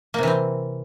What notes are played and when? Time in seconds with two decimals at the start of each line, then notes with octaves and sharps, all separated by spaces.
0.14 A#3
0.18 C3
0.23 E3
0.27 C4